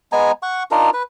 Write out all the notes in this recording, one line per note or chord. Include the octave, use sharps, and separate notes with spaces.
G#3 B3 G#5 A#5
F#5 C#6
D4 D#4 F4 A#4
B4